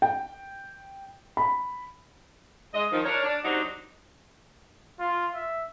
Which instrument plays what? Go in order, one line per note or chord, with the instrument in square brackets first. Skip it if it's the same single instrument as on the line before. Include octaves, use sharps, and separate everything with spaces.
[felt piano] G5
B5
[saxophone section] G#3 D#5
D#3 F3 D#4
D4 A#4 C#5
D4
C3 F#3 D4 D#4 F#4 C5
[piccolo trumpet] F4
E5